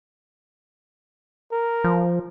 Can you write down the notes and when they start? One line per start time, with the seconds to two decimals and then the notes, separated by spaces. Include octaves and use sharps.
1.52 A#4
1.84 F3